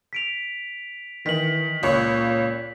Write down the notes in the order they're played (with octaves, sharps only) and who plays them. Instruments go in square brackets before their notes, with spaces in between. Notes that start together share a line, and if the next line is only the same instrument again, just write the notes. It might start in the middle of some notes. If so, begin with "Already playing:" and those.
[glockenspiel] B6 D7 F7
[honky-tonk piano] D#3 [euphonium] E3 [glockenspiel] B6 F#7
[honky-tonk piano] C#2 C#5 [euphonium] A#2